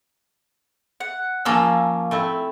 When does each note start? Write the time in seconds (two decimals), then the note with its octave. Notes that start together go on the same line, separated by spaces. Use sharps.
1.00 F#5
1.45 F3 A#3 C#4 A5 E6
2.11 A3 C4 E4